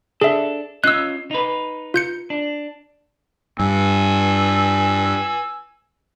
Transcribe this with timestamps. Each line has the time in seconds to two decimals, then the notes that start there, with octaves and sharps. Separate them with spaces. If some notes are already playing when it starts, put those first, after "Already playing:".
0.21 D4 G#4 A4 E5
0.84 C#4 F4 D#5 E6 F#6
1.31 D#4 B4
1.94 F4 G6 C#7
2.30 D4
3.59 G2 G#5 E6